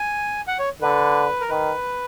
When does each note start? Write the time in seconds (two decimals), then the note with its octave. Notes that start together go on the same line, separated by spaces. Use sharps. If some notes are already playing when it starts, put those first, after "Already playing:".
Already playing: G#5
0.48 F#5
0.59 C#5
0.81 D3 B4
1.41 A#4
1.49 D#3 B4